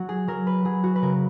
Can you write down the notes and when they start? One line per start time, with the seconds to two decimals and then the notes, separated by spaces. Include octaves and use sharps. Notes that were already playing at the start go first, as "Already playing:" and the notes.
Already playing: F#3 F#4
0.09 G#4
0.28 F#3 A#4
0.47 B4
0.65 F#3 G#4
0.84 F#4
0.96 B4
1.02 C#3 A#4